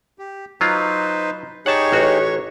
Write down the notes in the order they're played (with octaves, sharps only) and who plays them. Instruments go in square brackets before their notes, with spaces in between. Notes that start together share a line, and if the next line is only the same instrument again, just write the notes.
[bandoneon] G4
[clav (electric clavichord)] F#3 F4 [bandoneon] D#4 B4 C5
[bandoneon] D#4 G4 G#4 [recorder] C#5 [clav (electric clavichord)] F#5 A5
[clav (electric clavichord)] A1 F#4